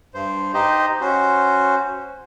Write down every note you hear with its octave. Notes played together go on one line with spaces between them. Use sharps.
G2 C5
D#4 G4 C5 D#5
C#4 F#4 C5